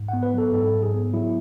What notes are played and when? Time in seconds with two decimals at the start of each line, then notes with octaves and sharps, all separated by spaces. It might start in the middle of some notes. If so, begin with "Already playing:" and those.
Already playing: G#2
0.08 B3 F#5
0.23 B4
0.34 F#3 A4
0.53 G#2 A4
0.73 G#2
0.83 G#4
0.94 B3
1.13 F#3 E4